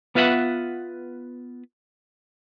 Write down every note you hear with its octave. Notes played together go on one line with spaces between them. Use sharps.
B3 F4 B4 E5 F#5